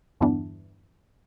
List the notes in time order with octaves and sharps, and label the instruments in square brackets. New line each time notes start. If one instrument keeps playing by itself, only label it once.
[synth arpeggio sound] E2 G2 D3 E3 B3 D4